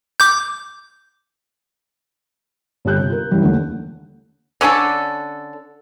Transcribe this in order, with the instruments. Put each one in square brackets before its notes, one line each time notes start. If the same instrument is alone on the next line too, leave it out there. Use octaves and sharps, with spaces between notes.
[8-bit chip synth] D6 G6
[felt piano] G1 G3 G4 F#6 G6
C3
F4 A#4
F#2 E3 G3
D#2 D3 A3
[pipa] D3 C#4 D4 A4